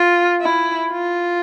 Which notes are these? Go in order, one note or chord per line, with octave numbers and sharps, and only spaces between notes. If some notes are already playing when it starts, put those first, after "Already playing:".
Already playing: F4
E4
F4